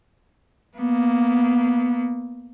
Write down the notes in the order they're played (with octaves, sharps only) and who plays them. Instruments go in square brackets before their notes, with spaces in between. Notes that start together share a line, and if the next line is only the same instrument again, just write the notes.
[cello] A#3 B3